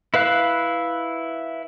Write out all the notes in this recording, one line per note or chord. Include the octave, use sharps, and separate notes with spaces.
E4 B4 F5 F#6